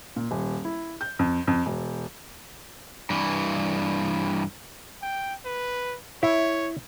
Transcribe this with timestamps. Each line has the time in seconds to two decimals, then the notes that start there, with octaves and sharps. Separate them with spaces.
0.16 A#2
0.31 D#1
0.65 E4
1.01 G6
1.19 F2
1.47 F2
1.66 E1
3.10 G2 E3
5.02 G5
5.45 B4
6.23 E4 C#5